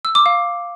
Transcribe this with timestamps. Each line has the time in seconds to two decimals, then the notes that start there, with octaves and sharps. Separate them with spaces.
0.05 E6
0.15 D6
0.26 F5